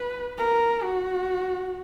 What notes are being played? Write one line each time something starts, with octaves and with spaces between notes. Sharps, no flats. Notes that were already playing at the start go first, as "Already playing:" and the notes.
Already playing: B4
A#4
F#4